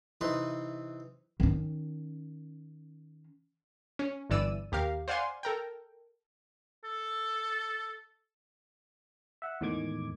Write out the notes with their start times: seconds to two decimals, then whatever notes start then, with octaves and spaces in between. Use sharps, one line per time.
0.21 C3 E3 D#4 B4 C6
1.40 D#3 C#4
3.99 C#4
4.30 G1 G2 E3 D5 E6 D#7
4.72 D#2 G4 A#4 F5
5.08 C5 D5 F5 F#5 G#5 C6
5.43 A4 A#4 G5
6.84 A4
9.42 E5 F#5
9.61 E2 A2 D#3 G#3 D6 G#6